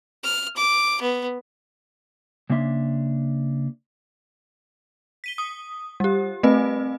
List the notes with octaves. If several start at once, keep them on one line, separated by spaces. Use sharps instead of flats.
F6
D6
B3
C#3 A#3 C#4 D4 E5 C6
B6 D#7 G7
D#6
G3 G4
A3 C4 B4 D#5